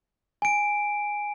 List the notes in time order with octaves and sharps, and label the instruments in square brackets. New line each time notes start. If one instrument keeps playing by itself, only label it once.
[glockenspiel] G#5 D7